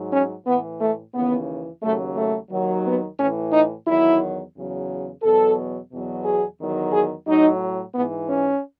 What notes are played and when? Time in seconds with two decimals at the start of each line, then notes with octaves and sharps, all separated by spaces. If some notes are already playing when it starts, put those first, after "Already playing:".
Already playing: G#2 F#3
0.13 C#4
0.47 A2 E3 B3
0.81 A3
1.14 D#2 C#3 E3 B3
1.83 D#2 C#3 F#3 A3
2.17 A3
2.51 D#2 D#3 F#3
2.85 B3
3.19 A2 E3 C#4
3.53 D#4
3.87 E2 D#3 F#3 E4
4.55 E2 C#3 F#3
5.23 E2 B2 F#3 A4
5.91 E2 B2 F#3
6.25 G#4
6.59 E2 D#3 F#3
6.93 G#4
7.27 A2 F#3 D#4
7.95 G#2 E3 B3
8.29 C#4